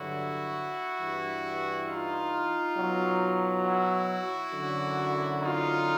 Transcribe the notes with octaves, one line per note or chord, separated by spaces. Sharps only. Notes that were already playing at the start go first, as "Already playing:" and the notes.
Already playing: G2 D3 F#3 E4 F#4
G2 E3
D#4 F4
B2 F#3
E4 F#4
F#2 D3 F#3
D#4 F4